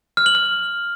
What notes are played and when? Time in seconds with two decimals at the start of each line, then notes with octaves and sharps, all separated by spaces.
0.17 F6
0.26 F#7
0.35 F6